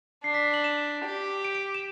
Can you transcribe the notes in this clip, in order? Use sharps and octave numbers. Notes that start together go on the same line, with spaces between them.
D4 C7
B6
C7
F#7
E7
G4
D7
D7
E7